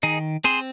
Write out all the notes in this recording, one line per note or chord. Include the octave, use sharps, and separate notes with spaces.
D#3 D#4 G#4
C4 G#4 C5